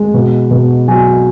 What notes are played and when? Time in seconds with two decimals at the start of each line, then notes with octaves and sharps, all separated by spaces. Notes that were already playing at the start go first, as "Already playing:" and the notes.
Already playing: G#3
0.14 B2
0.51 B2
0.88 F#3 G#5